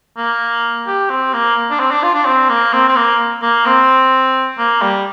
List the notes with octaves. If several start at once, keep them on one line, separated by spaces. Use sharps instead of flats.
A#3
G4
C4
A#3
D4
C4
D4
F4
D4
C4
A#3
C4
C4
A#3
A#3
C4
A#3
G3